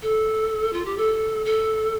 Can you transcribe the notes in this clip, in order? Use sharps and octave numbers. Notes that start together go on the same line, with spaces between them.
A4
F4
G4
A4
A4